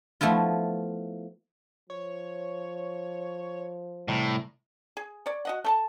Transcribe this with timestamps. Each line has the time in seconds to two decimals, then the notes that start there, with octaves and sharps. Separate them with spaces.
0.21 F3 A3 B3 E4 F4
1.90 F3 C#5
4.08 C2 A2 E3
4.97 G#4
5.26 C#5 D5
5.45 F#4 D#5 F#5
5.64 A3 A4 A5